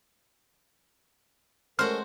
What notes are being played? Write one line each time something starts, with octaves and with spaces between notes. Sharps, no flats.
G#3 A3 C#4 F#4 A#4 C5 F6